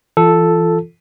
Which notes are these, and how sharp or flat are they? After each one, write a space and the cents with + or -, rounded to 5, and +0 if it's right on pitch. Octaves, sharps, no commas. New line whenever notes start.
E3 +20 F4 -15 A4 +0